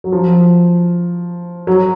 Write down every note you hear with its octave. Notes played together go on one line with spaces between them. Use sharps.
F#3
F3
F#3